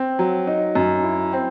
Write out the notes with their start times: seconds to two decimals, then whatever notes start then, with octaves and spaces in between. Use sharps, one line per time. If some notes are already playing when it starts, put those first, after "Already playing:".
Already playing: C4
0.19 F#3
0.47 D#4
0.75 F#2
1.04 E4
1.33 C4